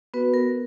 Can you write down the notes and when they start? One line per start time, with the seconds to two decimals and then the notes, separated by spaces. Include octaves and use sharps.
0.14 B3 F#4 B4
0.34 A#4